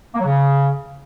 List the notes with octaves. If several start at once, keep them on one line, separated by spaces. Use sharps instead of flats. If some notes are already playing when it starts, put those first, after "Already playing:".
A#3
F#3
C#3